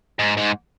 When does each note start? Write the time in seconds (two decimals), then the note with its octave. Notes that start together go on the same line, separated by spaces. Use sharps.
0.19 G#2
0.37 G#2